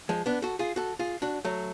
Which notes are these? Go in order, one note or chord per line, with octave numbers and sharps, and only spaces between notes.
F3 G#3
B3 D4
F#4 A4
F4 G#4
F#4 A4
F4 G#4
D4 F#4
F#3 A3